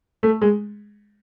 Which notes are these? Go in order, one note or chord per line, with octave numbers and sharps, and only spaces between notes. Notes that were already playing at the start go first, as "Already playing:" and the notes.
A3
G#3